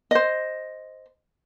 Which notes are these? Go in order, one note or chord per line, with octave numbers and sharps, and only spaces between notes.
C5 D#5